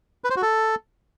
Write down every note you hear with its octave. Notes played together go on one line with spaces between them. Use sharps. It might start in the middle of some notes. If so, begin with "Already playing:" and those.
B4
C5
F#4
A4